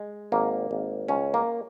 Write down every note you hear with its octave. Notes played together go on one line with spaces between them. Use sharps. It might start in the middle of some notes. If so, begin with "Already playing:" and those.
Already playing: G#3
G#1 A#3
G#1
C#2 C#4
A#3